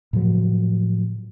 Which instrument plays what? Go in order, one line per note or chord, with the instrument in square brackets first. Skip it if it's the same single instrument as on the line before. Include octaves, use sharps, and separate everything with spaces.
[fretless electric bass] A2 C#3 F3 F#3